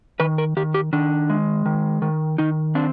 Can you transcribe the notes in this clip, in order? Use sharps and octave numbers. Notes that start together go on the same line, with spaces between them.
D#3 B4
A#4
D#3 G4
G4
D#3 D4
G#3
D#3
D#3
D#3 D#4
C4 D4